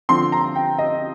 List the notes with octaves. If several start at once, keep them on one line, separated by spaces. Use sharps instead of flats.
D3 F3 C4 C6
A#5
G5
D#5